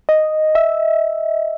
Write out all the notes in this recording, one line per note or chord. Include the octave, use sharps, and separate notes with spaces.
D#5
E5